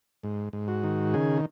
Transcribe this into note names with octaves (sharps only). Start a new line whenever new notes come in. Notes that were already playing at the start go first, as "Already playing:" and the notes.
G#2
G#2
F#4
D#3
C#3 G#4